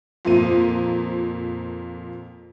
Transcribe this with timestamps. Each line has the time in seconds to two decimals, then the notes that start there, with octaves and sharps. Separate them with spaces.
0.25 F2 A#2 F3 A#3 D#7